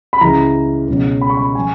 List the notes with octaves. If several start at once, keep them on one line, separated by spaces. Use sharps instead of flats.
B5
C#2 C#3 E3 A#5
C#2 B2 F#3
B5
C#6
B5
F#3 G#5